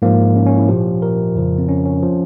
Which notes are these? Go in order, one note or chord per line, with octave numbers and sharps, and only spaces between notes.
G#2 F3 A#3
C#4
C#4
E4
A#2 F3 G4
A#4
F2 C#3 F3
C4
C#4
C#4
F3